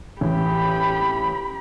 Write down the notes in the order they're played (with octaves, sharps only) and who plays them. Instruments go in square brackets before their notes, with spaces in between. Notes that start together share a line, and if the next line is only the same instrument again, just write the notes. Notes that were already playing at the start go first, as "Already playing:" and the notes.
[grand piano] A1 [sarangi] G4 [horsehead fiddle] B5